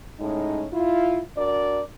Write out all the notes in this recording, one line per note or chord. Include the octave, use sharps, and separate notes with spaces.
A2 G#3 C#4 D#4
E4 F4
D4 F#4 A#4 D5